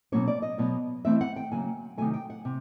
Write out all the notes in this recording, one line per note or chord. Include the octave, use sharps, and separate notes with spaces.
B2 F#3 A#3 C#4 C#5
D5
D#5
B2 F#3 B3
E3 A3 C4 E5
F#5
G5
C#3 F#3 A#3 G#5
C3 D#3 F#3 A3 G#5
G5
F#5
C3